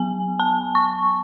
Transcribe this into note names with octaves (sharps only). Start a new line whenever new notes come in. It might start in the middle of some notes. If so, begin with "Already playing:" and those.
Already playing: F#3 B3 G#5
A5
C#6